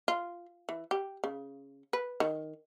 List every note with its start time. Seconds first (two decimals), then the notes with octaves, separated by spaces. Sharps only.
0.08 F4
0.69 E3
0.91 G4
1.24 C#3
1.93 B4
2.20 D#3